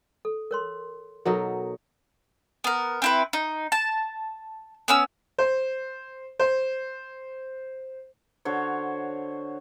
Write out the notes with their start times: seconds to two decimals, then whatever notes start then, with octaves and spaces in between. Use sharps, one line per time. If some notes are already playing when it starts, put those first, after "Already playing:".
0.25 A4
0.51 A#4 C#5 C6
1.26 B2 F#3 D#4 A4 A#4
2.64 B3 A#4
3.02 C4 E4 B4
3.33 D#4
3.72 A5
4.88 B3 C#4 E6
5.38 C5
6.39 C5
8.45 D3 F#4 C5 C#5